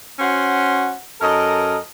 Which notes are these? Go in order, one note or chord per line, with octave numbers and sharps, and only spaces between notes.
C#4 F#4 C5 F#5
F#2 A4 A#4 D#5